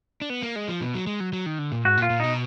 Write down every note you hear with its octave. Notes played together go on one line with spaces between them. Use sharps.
D4
B3
A#3
G#3
F3
B2
F#3
G#3
F#3
F#3
D#3
D3
A#2
G#2 F#4
A#2
F4
A#2
B2 D#4